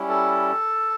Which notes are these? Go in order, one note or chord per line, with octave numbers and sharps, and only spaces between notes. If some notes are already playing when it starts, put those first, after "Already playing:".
Already playing: G3 C#4 E4
A4